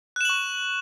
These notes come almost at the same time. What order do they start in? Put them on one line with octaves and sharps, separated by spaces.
F#6 E7 F#7 C#6